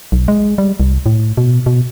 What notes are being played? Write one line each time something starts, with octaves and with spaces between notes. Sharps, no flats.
B1
G#3
G3
C2
A2
B2
B2